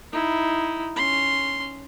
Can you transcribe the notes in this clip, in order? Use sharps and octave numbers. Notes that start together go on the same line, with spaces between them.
D#4 E4
C#4 C6